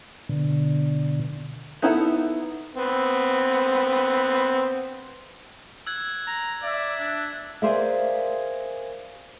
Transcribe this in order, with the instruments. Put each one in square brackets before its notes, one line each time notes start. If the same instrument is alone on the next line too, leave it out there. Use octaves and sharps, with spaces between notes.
[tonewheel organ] B2 D3
[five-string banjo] B3 D#4 E4 A4 F#5
[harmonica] B3 C4
[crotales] E6 F#6 G#6
[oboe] A#5
[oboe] D5 [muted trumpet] E5
[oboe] D4
[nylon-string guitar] G#4 A#4 C5 D5 E5 F5